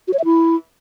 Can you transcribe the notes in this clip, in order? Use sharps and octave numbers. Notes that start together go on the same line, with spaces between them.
F#4
C#5
E5
E4